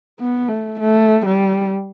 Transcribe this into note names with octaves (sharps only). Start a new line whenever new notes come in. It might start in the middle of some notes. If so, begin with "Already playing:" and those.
B3
A3
A3
G3